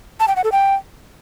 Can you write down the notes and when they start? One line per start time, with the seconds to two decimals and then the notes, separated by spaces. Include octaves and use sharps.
0.20 A5
0.28 G5
0.36 F#5
0.44 A4
0.52 G5